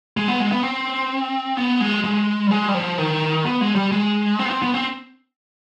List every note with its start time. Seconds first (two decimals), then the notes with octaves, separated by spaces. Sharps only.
0.17 G#3
0.28 B3
0.40 G#3
0.52 B3
0.63 C4
1.57 B3
1.80 G#3
2.04 G#3
2.47 G3
2.51 G#3
2.68 G3
2.74 F3
2.98 D#3
3.45 B3
3.61 G#3
3.75 G3
3.92 G#3
4.39 C4
4.45 B3
4.50 C4
4.62 B3
4.74 C4